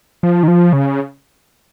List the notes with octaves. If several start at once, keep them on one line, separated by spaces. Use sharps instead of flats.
F3
D#3
F3
C#3